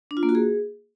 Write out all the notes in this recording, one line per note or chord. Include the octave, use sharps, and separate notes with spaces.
D4
F4
A#3
F#4
G#4